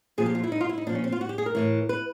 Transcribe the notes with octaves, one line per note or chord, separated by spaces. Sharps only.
A#2 F3 G#4
G4
F4
E4
D#4
F4
E4
D#4
A#2 F3 D4
C#4
C4
F4
F#4
G4
G#4
A#4
A2 E3
B4